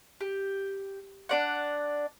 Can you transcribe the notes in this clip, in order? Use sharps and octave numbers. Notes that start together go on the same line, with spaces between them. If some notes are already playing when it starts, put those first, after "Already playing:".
G4
D4 D5 F#5